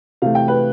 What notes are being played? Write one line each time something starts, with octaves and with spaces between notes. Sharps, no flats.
C3 E3 A3 F5
G5
B4